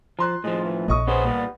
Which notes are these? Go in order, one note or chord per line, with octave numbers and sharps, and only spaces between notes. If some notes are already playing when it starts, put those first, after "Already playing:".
F3 A#5 C6 F#6
A2 F3 G#3
E3
A#1 A2 D#5 C#6 D#6
B3 C#4 G#4 C5
A#2 G3